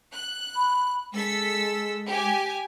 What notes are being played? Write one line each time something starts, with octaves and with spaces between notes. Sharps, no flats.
F#6
B5
G#3 A4 E6 B6
G4 G#5